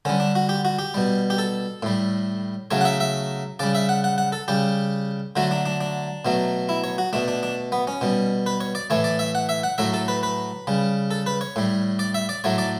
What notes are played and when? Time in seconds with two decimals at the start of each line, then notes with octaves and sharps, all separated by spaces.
0.05 D3 G3 C#4
0.20 D4
0.35 F#4
0.49 G4
0.65 F#4
0.79 G4
0.94 B2 G3
1.30 G4
1.38 A4
1.83 A2 G3
2.71 C#3 F#3 A3 C#5
2.81 F#5
2.85 E5
3.00 E5
3.59 C#3 G3 D5
3.75 E5
3.89 F#5
4.04 F#5
4.18 F#5
4.32 A4
4.48 C#3 G3 G4
5.36 D3 F#3 A3 F#4
5.51 D4
5.66 D4
5.81 D4
6.25 B2 F#3 A3
6.69 E4
6.84 C#5
6.98 F#4
7.13 B2 A3 D4
7.28 D4
7.43 D4
7.72 B3
7.87 C#4
8.01 B2 G3
8.46 B4
8.61 C#5
8.75 D5
8.90 A2 E3 A3 C#5
9.04 D5
9.19 E5
9.35 F#5
9.49 E5
9.63 F#5
9.78 A2 F#3 A3 E5
9.93 A4
10.08 B4
10.23 B4
10.67 C#3 G3
11.11 A4
11.26 B4
11.41 C#5
11.56 A2 G3
11.99 D5
12.14 E5
12.29 D5
12.44 A2 F#3 A3 C#5
12.58 D5